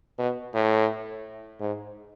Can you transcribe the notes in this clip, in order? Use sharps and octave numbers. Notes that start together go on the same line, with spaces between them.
B2
A2
G#2